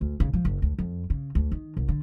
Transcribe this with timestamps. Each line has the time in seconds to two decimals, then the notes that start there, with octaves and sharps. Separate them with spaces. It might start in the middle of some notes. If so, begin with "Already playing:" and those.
0.01 D2
0.20 C#3
0.34 F3
0.45 F#1
0.62 D2
0.79 F2
1.10 C#3
1.35 D2
1.52 D#3
1.77 C2
1.89 D3